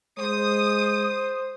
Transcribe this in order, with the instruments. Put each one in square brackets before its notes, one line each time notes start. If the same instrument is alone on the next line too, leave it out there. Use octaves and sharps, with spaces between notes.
[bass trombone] G#3 [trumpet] C5 [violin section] D#6